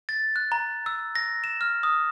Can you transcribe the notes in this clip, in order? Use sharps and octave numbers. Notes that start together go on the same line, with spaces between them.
A6
F#6
A#5
E6
A#6
E7
F6
D#6